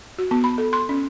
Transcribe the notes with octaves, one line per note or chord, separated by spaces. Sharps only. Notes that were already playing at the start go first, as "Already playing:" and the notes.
F#4
B3
B5
A4
C6
C#4